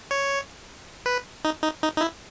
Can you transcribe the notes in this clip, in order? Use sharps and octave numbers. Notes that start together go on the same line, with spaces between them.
C#5
B4
D#4
D#4
D#4
D#4
E4